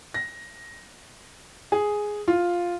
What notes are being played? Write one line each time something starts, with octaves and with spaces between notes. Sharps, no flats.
A#6
G#4
F4